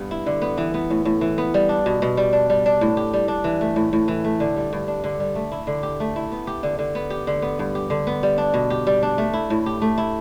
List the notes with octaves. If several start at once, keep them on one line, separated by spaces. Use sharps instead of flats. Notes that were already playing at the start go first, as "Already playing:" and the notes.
Already playing: G2 B3
E4
D3
B3
E3
B3
A2
A2
E3
B3
G3
D4
B2
B2
G3
D4
G3
D4
A2
G4
G3
D4
E3
A3
A2
A2
E3
A3
D3
G3
G2
D4
D3
G3
A3
E4
D3
G4
A3
E4
B3
G4
D3
D3
B3
G4
D3
B3
G2
G4
D3
B3
G3
D4
B2
G4
G3
D4
A3
E4
A2
G4
A3
E4